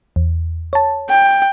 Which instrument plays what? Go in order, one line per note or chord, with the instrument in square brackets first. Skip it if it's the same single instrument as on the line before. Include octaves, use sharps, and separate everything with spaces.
[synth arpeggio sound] E2
C#5 A5
[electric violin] G5